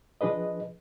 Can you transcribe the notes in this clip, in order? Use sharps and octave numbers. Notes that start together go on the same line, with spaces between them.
F3 D4 G#4 B4 D#5